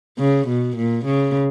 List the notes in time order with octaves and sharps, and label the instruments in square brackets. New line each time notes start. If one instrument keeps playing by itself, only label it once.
[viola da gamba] C#3
B2
A#2
C#3